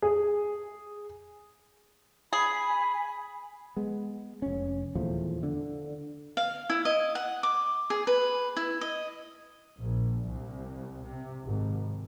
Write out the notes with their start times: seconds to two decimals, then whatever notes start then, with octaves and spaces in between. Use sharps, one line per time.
0.02 G#4
2.33 G#4 G#5 B5
3.77 G#3 B3
4.42 F1 C#4
4.95 D#1 E2 F3 A3
5.43 D3
6.37 F5
6.70 E4
6.85 D#5
7.15 F#5
7.43 D6
7.90 G#4
8.07 B4
8.57 E4
8.81 D#5
9.78 A#1
10.27 C2
11.05 C3
11.45 G#1